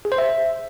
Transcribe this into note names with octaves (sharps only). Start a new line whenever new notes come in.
G#4
C5
E5